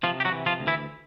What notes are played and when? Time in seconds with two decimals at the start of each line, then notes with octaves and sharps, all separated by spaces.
0.03 C3 F3 F4
0.20 G4
0.25 F#3 F#4
0.32 E3
0.46 F3 F4
0.60 D2
0.67 E3 E4